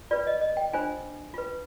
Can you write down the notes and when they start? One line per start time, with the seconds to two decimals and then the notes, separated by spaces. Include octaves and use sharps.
0.11 F4 B4 D5
0.27 D#5
0.41 D#5
0.57 G5
0.73 D4 F4 C5 G#5
1.34 F4 B4